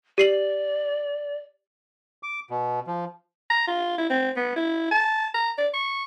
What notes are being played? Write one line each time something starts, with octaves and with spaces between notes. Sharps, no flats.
G4 D5 C7 F#7
D6
B2
F3
A#5
F4
E4
C4
B3
E4
A5
A#5
D5
C#6